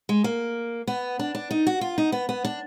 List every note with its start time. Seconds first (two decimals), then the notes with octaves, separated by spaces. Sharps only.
0.09 G#3
0.24 A#3
0.87 B3
1.19 D4
1.35 D4
1.51 D#4
1.67 F#4
1.81 F4
1.98 D#4
2.12 B3
2.29 B3
2.45 D4